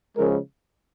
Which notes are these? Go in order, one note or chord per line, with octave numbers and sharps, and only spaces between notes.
C#3 F3 G#3 A#4